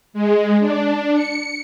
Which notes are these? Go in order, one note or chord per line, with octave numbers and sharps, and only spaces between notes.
G#3
D4
C#7